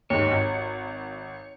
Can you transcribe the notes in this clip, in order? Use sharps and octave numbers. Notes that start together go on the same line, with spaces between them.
D#2 G#2 C#5
G#1